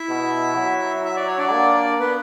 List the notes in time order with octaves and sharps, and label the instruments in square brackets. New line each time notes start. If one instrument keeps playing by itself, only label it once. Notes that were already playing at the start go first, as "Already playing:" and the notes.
Already playing: [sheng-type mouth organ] E4 E5
[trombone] B2
F#3
[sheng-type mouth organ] E5
D5
C#5
D4 D5
[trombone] A#3
[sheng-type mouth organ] B3 B4